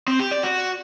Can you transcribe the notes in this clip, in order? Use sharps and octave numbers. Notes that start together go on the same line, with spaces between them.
C4
G4
D5
F#4